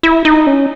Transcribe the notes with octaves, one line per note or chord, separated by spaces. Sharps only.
E4
D#4
C#4